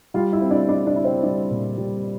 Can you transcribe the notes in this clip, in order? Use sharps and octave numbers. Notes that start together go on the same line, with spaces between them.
G3 F4 F5
E4 E5
C4
D4 D5
D4 E4 D5
D4 D5
E4
C4 C5
G3 D4 D5
A#2
G3